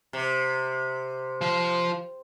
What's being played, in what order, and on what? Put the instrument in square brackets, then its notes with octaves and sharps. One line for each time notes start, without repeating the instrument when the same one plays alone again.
[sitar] C3
[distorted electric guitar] F3 C5